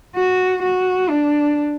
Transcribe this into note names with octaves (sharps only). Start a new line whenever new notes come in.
F#4
F#4
D4